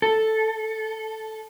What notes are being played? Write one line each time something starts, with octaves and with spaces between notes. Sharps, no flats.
A4